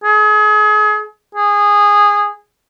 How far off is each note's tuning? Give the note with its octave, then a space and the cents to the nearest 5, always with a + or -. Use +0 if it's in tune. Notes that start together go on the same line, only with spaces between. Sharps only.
G#4 +35
G#4 -15